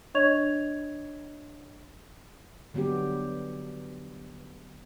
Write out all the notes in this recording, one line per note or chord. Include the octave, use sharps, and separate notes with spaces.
D4 C#5 D#5 C#6 G#6 F7
D3 F#3 G3 B3 G4